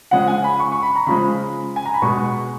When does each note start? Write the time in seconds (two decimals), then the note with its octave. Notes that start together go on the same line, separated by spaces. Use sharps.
0.11 C#3 F3 G#3 F#5
0.27 G#5
0.44 B5
0.60 C#6
0.72 C#6
0.83 B5
0.96 A#5
1.07 C#3 F3 G#3 B5
1.76 G#5
1.85 A#5
1.94 B5
2.02 B2 G#3 C#6